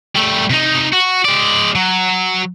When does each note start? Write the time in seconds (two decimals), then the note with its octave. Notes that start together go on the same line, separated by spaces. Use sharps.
0.16 G3 A3
0.50 C3 D#4
0.93 F#4
1.25 G#3 D5
1.75 F#3